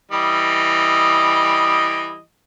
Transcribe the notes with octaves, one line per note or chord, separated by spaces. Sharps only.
E3 G3 D#5